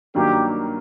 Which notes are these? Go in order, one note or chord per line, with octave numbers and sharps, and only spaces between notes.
G2 D#3 F#3 A#3 G4